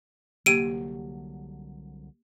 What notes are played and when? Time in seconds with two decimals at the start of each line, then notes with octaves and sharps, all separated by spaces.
0.46 C2 D3 F#3 A#3 G4 D7 D#7